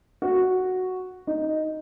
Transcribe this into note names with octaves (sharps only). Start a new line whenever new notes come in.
F#4
D#4